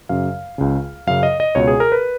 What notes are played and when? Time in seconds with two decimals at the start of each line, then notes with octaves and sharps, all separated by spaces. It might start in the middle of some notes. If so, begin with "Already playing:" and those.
0.09 F#2 C#3 F5
0.58 C#2 C#3
1.07 F#2 C#3 F5
1.23 D#5
1.40 D#5
1.55 C#2 B2 C#5
1.67 G#4
1.80 A#4
1.92 B4